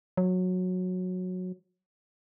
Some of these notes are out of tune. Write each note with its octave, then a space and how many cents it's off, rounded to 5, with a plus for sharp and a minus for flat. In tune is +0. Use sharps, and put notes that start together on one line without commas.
F#3 -15